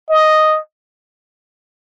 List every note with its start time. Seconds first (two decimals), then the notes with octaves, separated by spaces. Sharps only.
0.10 D#5